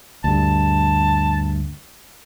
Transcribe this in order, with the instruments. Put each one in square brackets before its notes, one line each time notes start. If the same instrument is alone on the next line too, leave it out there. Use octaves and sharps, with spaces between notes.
[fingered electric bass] D2 G2 [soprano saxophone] A5